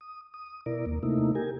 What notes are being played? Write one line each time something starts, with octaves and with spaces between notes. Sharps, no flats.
D#6
D#6
B2 E4 A#4 D5
D#2 A#3
C3 A3 A#3 D#4 E4
G4 A#4 G#5